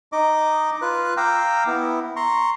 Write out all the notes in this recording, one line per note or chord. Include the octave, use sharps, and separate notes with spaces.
D#4 D#5 D6
F4 B4 F#6
F5 G5 A#5 D6 E6
B3 E4
A#5 C6 C#6